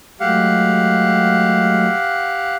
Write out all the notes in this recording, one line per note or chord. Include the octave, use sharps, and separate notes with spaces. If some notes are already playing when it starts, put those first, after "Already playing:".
F#3 G#3 A3 G4 F5 F#5